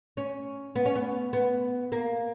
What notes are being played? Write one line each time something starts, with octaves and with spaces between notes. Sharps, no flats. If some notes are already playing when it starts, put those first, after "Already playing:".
C#4
B3
C#4
B3
B3
A#3